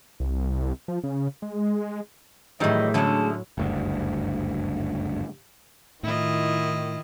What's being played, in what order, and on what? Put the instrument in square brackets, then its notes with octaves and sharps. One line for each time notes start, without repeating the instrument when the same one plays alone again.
[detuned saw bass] C2
F3
C#3
G#3
[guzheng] A2 F#3 [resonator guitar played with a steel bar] D#3 E3 G3 [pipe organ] A3 G#4 [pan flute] D#5
[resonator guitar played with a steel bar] D3 G#3 C#4 [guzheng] F#3 E4 [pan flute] A5
[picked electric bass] F#1 D2 G2
[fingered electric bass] A2 [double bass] D#3 [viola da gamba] E4 F4 D#5